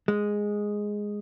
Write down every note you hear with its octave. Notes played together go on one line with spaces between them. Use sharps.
G#3